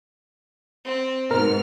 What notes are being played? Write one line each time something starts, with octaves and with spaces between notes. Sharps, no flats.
C4
G#2 B2 A#4 F6